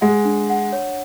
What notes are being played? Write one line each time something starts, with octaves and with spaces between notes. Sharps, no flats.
G#3 F#5
D4
F#5
C#5